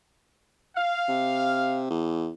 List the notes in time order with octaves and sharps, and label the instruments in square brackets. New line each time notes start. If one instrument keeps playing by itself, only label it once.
[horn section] F5
[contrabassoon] C3
E2